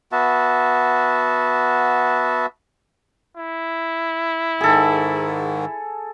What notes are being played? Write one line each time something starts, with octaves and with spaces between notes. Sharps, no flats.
B3 F#4 E5 A5
E4
G#2 D#3 G#4 A4